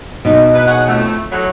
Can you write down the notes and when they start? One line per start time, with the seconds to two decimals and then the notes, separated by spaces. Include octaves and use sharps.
0.25 B2 D#4
0.54 E4 B4
0.67 G#4 C#5 F#5
0.87 F2 A2 A3
1.31 A2 F#3